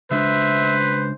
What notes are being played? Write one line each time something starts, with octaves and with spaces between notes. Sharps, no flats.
C#3 G#3 D4 B4 C5 E5